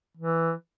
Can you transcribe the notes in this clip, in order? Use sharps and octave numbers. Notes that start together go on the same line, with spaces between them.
E3